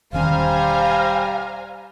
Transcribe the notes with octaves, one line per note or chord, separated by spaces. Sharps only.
E1 D#3 G3 C#4 C5 F5 G#5 A#5